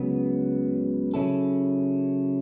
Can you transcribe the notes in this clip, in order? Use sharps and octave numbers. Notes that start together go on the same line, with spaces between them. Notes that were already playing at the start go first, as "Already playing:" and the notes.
Already playing: C#2 C#3 F#3 B3
C#3 F#3 C#4 E4 A4